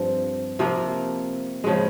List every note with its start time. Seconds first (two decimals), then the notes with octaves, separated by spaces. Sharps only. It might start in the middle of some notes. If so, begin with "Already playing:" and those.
Already playing: G2 F3 C4
0.59 C3 F3 A#3
1.64 C#3 F3 G#3